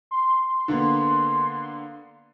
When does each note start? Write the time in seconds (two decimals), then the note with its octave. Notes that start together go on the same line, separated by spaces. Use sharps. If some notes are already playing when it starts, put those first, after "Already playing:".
0.11 C6
0.68 D3 A#3 B3